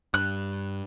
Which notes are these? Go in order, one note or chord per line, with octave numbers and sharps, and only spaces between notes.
G2 F#6